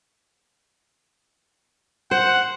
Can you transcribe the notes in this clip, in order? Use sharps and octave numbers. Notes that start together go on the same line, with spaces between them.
C5 F#5